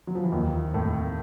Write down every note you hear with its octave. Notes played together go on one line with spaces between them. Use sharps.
F#3
F3
E3
D#2 D#3
A2 A3